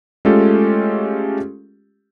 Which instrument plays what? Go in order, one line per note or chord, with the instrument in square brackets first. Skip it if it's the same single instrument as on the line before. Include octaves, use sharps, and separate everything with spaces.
[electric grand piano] G#3 A3 C#4 F4 G4 A4